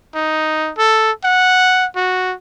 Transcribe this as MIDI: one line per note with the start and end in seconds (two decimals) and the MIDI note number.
0.15 0.72 63
0.78 1.12 69
1.25 1.87 78
1.96 2.35 66